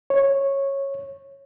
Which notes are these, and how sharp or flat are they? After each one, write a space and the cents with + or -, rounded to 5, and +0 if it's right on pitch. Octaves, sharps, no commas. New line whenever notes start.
C#5 -10